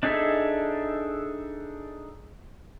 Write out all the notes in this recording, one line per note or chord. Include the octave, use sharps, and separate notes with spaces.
D4 D#4 G#4 A4 E5